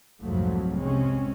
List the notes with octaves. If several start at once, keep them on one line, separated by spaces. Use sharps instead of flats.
C2 F2 G#2 F3 F#3 A3
C3 G#3 C4 C#4